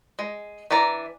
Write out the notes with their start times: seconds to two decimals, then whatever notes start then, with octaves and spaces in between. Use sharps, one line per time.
0.19 G#3
0.71 E3 D4 D5 A#5